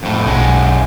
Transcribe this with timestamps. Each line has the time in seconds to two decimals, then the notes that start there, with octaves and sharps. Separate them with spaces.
0.03 F2 A2
0.26 B1 F#2 G#3